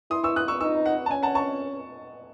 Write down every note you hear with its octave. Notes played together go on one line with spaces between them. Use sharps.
E4 C6 D#6
C#6 E6
D#6 F#6
C#6 E6
D#4 C#6 E6
F#5
A5
C#4 G#5
F#5 A5
A5 C#6